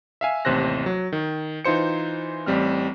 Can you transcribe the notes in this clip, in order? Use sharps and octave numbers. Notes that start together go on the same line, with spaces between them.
E5 F5 G#5
A1 D#2 C3 C5 F#6 A#6
F#3
D#3
E3 D#4 F4 C5 C#7
A1 G3 C4 F6